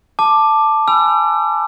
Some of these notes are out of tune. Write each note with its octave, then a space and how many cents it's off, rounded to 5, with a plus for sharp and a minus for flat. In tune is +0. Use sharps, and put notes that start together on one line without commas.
A5 +0 D6 +10
G#5 +0 B5 +5 E6 +40